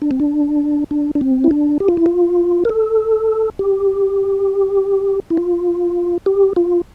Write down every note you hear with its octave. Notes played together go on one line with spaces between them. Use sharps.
D4
C4
D4
D4
D4
C4
E4
D4
G4
F4
E4
F4
A#4
A4
G4
E4
F4
G4
F4